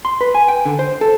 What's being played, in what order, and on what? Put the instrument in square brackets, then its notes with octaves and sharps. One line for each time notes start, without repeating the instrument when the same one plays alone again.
[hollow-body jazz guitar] C6
B4
G#5
G5
D3
C5
A4